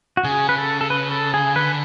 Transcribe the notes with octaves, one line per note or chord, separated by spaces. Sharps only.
F#4
C#3 G#4
B4
A4
A4
B4
A4
G#4
D3 B4